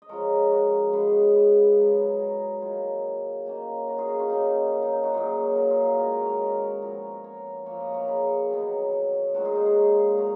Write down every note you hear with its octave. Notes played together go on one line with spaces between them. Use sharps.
D#5
C#3 F3 G#3 A#4 C#5
F#4 A#4
C#3 G#3 B3 G#4 B4
G#4 B4
G#2 F#3 B3
G#4
F#4 A#4
D#3 F#3 A#3 F4 G#4
D#3 A#3 C#4
F#4 A#4
F4 G#4
D#4 F#4
C#4 F4
D#3 A#3 C#4 D#4
C#4
D#4
D#4
D#4 F#4
A#2 F#3 C#4 F4 G#4
F#4 A#4
F4 G#4
F#4 A#4
D#3 G#3 C#4 A#4 C#5
A#4 C#5
A#4 C#5
A#2 F3 B3 A#4 C#5
A#4 C#5
A#2 F3 A#3 A#4 C#5
B4 D#5
A#4 C#5
G#4 B4
D#3 F#3 B3
A#2 G#3 C#4 F#4 A#4
F4 G#4
D#4 F#4
F4 G#4
F#3 C#4 F#4 A#4